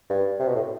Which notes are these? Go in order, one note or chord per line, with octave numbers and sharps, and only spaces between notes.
G2
C3
B2
A2